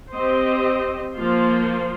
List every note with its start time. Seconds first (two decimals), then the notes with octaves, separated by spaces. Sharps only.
0.13 C4 G4 C5 D#5
1.16 F3 A#3 F4 C5